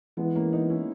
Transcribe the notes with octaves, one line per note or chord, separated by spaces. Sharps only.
E3 G#3 B3
A#3 C#4
B3 D#4
C#4 E4